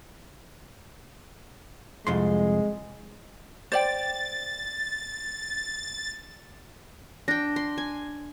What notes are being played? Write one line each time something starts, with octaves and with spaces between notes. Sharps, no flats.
C2 F2 G#3 C6
C5 D5 G5 A6
D4 G5 A#6
C6
G#5